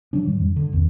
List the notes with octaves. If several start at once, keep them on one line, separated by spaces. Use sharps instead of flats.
D#3 F3 F#3 D4
G#2 D#3 G3
F2
D3
A1 E2 D#3